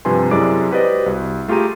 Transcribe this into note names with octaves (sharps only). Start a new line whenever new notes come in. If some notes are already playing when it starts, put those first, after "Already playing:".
G2 C3 F3 B4 G#5 C6
F#2 C3 G#3 E4 D5 D6
F#4 G4 B4 C5 D5 D#5
C2
A3 F4 G4 G#4 A#5 D#7